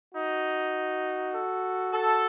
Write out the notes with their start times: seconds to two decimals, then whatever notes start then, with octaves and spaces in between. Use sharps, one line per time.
0.14 D#4 F#4
1.34 A4
1.93 A4